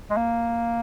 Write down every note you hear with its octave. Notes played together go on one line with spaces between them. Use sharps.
G#3
A#3